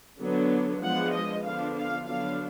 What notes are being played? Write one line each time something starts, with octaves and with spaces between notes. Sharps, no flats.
D3 F#3 B3 D4
F3 G#3 B3 D4 F#5
D#5
D3 F3 B3 D4 F5
F5
D3 F#3 B3 D4 F5